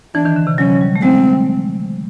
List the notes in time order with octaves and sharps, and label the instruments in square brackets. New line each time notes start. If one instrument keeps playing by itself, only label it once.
[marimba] E3 [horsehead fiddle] D4
[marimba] D#3
D3
C3
[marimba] F#3 [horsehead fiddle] C#4
[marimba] G3
A3
[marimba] G#3 [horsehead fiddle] C4